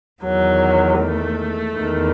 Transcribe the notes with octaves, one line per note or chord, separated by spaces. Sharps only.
E2 D#3 F#3
A3
E2 D#3